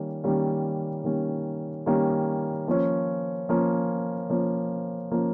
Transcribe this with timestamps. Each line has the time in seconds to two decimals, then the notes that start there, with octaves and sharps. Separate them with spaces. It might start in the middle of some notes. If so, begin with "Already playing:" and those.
Already playing: D#3 G3 A#3 C#4
0.24 D#3 G3 A#3 C#4
1.04 D#3 G3 A#3 C#4
1.86 D#3 G3 A#3 C#4
2.68 F3 A#3 C#4
3.49 F3 A#3 C#4
4.30 F3 A#3 C#4
5.11 F3 A#3 C#4